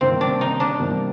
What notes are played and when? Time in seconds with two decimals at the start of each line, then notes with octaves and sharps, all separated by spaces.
0.01 C3 D#3 G3 A#3 C4
0.21 D4
0.41 D#4
0.60 D4
0.80 C3 D#3 G3 A#3